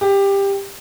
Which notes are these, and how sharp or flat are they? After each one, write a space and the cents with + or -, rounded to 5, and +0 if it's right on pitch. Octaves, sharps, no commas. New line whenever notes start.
G4 +15